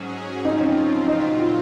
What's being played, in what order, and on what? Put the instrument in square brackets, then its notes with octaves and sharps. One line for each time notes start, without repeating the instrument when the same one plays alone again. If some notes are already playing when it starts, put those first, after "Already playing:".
Already playing: [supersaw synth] G#2 F#3 C#4 G#4
[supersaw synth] C#3 F3 C4 F4 [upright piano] D#4
[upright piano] C#4
[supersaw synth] A#2 F#3 C4 F4 [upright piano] D#4
[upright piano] F4